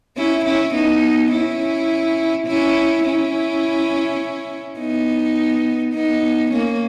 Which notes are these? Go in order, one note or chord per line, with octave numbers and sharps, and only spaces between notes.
C#4 E4
C#4 E4
B3 D#4
C#4 E4
C#4 E4
C#4 E4
B3 D#4
B3 D#4
A#3 C#4